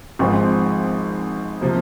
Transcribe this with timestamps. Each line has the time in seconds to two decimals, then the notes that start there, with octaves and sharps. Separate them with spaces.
0.19 G#1 G#2 F3 G#3 C4
1.61 C3 F3 A#3